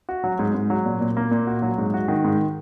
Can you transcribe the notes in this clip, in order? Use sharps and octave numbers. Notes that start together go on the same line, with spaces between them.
F#4
F#3
G#2
G#2
F#3
A#2
A#2
A#3
A#2
F#4
F#3
G#2
F#4
D#3
G#2